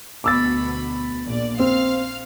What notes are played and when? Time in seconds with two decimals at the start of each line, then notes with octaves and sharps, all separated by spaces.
0.24 D2 B2 B5 D6 E6 A6
1.26 A#1 D5
1.60 C4 F5 F6